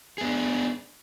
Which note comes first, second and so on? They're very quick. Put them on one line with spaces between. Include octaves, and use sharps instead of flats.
G#4 B3 D4